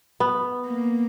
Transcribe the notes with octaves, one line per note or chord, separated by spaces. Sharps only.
B3
A#3